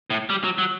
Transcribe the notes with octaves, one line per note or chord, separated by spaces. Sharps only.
A2
G3
F#3
F#3